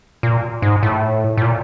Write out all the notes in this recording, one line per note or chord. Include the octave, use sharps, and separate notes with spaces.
A#2
G#2
A2
A2
A#2